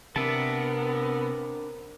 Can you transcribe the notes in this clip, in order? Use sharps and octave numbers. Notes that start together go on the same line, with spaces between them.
C3 B3 C4 D4 A#4 E5 A5